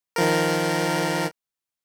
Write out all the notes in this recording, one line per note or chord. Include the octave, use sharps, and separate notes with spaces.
D#3 F3 A#4